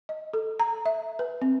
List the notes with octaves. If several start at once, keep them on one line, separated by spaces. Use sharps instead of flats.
D#5
A4
A#5
E5
B4
C4